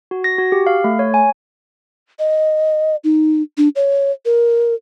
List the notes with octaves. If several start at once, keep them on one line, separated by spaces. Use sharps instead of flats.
F#4
A#6
F#4
G4
F5
A3
C#5
G#5
D#5
D#4
D4
C#5
A#4